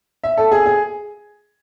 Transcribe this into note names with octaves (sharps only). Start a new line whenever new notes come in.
E5
A4
G#4
G#4